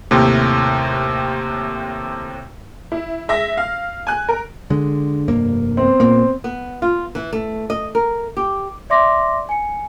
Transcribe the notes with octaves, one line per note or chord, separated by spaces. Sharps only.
D#2 A2 C3
E4
G#3 E5 A#6
F5
G#5 F#6
A#4
D3 G#3
F1 G2 A#3
B3 C4
A#2 A#3
B3
F4
E3
A3
D#5
A#4
G4
D5 E5 C6 D6 A#6
G#5 C#7